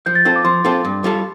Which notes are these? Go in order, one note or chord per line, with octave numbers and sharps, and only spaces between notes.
F3 G6
A6
C4 F4 A4
D6
F3 C6
C4 F4 A4
G2
G3 F4 A4